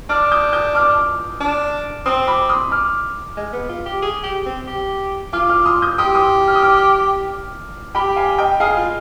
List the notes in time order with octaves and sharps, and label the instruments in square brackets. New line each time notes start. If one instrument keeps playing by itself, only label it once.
[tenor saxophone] D4 [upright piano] D6 F6
[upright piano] D#6 G6
D#6 G6
D6 F6
[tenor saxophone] D4
[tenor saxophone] C4 [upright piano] C6 D#6
[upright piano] B5 D6
C6 D#6
D6 F6
[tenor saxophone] G#3
B3
F4
G4
G#4
G4
C4
G4
[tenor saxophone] F4 [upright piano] D6 F6
[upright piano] D6 F6
C6 D#6
D#6 G6
[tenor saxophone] G4 [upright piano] C6 D#6
[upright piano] C6 D#6
F6
D#6
D6 F6
[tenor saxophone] G4 [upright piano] G5 B5
[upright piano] F5 G#5
D#5 G5
[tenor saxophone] G#4 [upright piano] F5 G#5
[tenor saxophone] F4